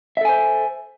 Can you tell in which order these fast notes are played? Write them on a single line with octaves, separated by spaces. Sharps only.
E5 A4 G#5 C5